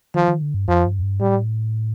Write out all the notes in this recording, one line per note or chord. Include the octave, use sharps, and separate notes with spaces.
D#3 F3
D#3
D3
G2
F2 F3
G2
F2
G2
A2 G3